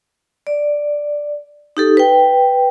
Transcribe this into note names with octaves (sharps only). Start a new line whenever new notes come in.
D5
D#4 G4 A4
B4 G5